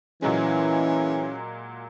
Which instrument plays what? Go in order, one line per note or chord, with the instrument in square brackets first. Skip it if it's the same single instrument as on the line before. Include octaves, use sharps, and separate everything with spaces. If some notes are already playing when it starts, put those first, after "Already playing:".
[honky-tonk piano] A#2 F#3 G#3 [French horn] E3 [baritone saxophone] C#4